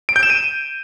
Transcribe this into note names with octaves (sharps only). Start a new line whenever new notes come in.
D7
G6
E7
D#7